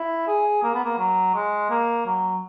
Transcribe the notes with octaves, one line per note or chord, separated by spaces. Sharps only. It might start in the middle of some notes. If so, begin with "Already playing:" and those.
Already playing: E4
G#4
A#3
B3
A#3
F#3
G#3
A#3
F#3